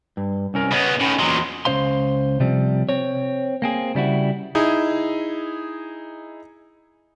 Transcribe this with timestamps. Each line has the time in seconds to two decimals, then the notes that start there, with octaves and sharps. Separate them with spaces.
0.17 G2
0.54 C2 C#4 A#4
0.71 C#3 B3 C#5 D#5
1.01 A2 D#3 C#4
1.19 E2 A#2 F#3 D#5 C6
1.65 C#2 F3 C#4 C5 F5 C6
2.40 C3 F3 G3 C4
2.89 C4 C#5
3.62 A#3 C4 G#4
3.95 C#3 G3 E4 F#4
4.55 D#4 E4 G#4